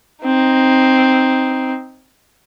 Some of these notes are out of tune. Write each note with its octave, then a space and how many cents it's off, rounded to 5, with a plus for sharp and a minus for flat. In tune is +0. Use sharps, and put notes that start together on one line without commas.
C4 +0 D#4 +0